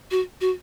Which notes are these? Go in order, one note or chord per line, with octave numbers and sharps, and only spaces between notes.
F#4
F#4